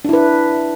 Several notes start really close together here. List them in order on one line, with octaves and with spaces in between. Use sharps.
D4 E4 B4